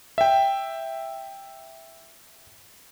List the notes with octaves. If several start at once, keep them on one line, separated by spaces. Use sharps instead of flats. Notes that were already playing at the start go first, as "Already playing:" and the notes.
E5 G5